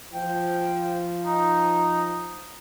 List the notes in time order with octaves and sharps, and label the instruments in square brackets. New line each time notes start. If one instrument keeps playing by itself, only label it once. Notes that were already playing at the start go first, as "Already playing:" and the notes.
[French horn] F3 [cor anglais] G5
[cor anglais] D#4